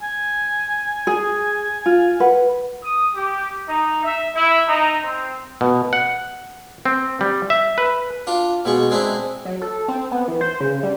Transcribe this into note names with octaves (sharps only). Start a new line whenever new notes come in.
G#5
G#4
F4
B4 F#5
D#6
G4
D#4
E5
E4
D#4
C4
B2
F#5
C4
G3
E5
B4
D4 F4
B2 G#3 C#6
G#3 C4 D4 E4
F#3
A4
C4
B3
E3
C5
C#3
G3